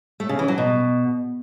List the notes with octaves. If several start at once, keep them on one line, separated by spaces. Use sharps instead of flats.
A3
C#3
E3
F#3
B2